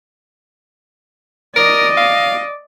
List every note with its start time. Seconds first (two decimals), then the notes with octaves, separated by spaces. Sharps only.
1.56 A#4 D5 D#5
1.97 F5